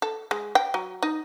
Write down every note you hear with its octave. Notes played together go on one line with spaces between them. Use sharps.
A4
G#3
G5
F#3
D#4